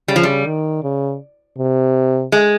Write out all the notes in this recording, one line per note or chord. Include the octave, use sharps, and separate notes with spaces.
C#3 G3
F3
G3
D#3
C#3
C3
G#3